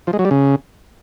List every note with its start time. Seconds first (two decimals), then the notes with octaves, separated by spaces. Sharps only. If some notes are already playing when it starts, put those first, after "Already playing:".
0.07 F3
0.13 G#3
0.19 F#3
0.25 G3
0.31 C#3